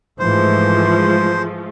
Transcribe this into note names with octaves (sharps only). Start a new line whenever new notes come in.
G#2 E3 F3 G#3 A3 C5